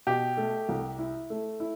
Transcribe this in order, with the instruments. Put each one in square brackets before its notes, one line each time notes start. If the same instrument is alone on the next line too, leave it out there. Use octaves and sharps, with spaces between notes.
[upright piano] B2 [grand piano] G4
[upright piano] A3
C2
E4
A3
E4